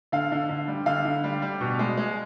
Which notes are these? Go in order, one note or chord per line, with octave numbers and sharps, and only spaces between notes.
D3 F5
D3
D3
G3
D3 F5
D3
G3
G3
B2
G#3
G#3